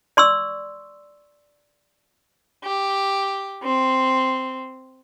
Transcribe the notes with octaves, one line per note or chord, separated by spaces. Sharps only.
D5 C6 C#6 E6
G4
C4